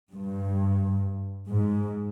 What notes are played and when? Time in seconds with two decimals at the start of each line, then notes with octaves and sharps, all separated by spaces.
0.13 G2
1.47 G#2